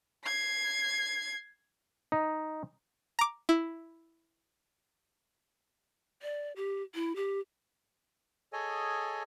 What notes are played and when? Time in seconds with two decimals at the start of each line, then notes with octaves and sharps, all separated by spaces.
0.24 G#6 C7
2.12 D#4
3.19 A#5 D6
3.49 E4
6.22 D5
6.56 G4
6.95 E4
7.16 G4
8.53 G#4 A4 C#5 D#5 G#5